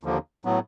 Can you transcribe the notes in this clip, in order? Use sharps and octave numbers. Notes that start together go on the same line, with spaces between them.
D#2 D3 F3 A#3
A2 F#3 B3